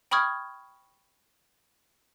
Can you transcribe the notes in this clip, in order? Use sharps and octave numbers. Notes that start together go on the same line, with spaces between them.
G5 B5 C#6 D#6 F6 G#6